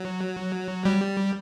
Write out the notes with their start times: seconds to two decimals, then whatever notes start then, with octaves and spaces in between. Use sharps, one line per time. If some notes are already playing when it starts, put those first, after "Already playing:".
Already playing: F#3
0.85 G3